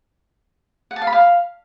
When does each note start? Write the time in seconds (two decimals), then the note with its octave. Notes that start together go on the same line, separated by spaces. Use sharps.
0.91 F#5
0.96 A5
1.02 F5
1.07 B5
1.13 F5